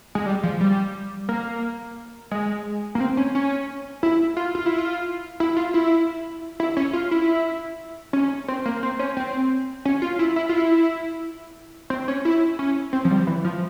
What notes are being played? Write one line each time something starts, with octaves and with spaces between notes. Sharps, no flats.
G#3
G3
F3
G3
A#3
G#3
A#3
C4
C#4
C#4
E4
F4
F4
E4
F4
E4
F4
E4
E4
C#4
F4
E4
C#4
C4
A#3
C4
C#4
C4
C#4
F4
E4
E4
F4
E4
C4
C#4
E4
C#4
C4
F3
G3
E3
F3